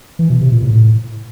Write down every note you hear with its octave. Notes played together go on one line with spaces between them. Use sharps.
E3
B2
C3
A#2
A2